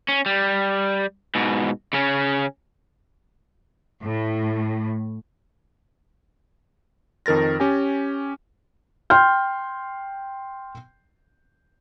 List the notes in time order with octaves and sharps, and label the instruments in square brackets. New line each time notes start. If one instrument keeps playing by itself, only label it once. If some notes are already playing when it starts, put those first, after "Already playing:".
[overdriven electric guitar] C#4
G3
G#2 B2
C#3 C#4
[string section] A2
[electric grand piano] F2 D#3 A#4 A6 A#6
C#4 G4 G#5
[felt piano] G5 C6 F6 G6